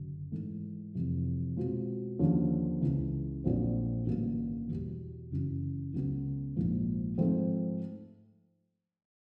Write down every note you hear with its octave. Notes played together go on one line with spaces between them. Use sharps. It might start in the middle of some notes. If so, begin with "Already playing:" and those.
Already playing: G1 F#2 C#3
G#2 E3 A3
F2 C3 E3
B2 G#3 C4 F4
D#2 D3 F3 A#3 C#4
C#2 C#3 E3
A#1 A#2 F#3 A3 C4
A1 G2 D3 F#3 A#3
E2 B2 G3
F#1 F#2 C#3 E3
C#2 C#3 F#3 B3
A#1 G#2 F3 A#3
G#2 F3 A3 C4